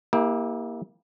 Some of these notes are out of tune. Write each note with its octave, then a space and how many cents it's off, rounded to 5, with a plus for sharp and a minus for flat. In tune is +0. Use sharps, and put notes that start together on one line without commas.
A#3 +10 E4 -25 G4 +25